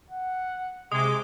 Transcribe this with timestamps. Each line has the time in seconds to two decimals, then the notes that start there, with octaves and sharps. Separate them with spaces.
0.10 F#5
0.92 C3 G#3 D6 D#6